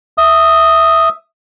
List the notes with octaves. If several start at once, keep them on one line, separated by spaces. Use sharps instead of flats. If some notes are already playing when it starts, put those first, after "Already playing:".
E5 D#6